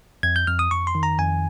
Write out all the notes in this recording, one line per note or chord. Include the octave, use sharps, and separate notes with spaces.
F2 G#6
G6
F2 F6
D#6
F2 C#6
C6
D#3
A#5
F2 G#5